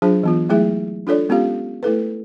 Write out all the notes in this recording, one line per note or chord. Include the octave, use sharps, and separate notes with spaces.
F#3 D4 F4 G#4 C5 A5
E3 B3 F4
F#3 G#3 A3 E4 G#4 E5
D4 F4 A4 C#5 D5
G#3 B3 C#4 F4 G4 F5
A3 E4 A4 B4